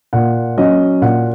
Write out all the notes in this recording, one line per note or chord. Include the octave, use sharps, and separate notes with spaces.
A#2 F#5
F#3 C#4 D#5
A#2 F#5